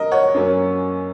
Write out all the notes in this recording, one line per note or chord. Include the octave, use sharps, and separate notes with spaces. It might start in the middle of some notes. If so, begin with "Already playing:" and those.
Already playing: A#4 D#5
C#5 F#5
F#2 F#3 A#3 C#4